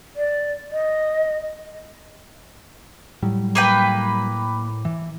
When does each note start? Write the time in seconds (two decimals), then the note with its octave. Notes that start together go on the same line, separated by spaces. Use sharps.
0.16 D5
0.71 D#5
3.23 A2 F#3 G3
3.55 A#3 B4 G5
4.85 E3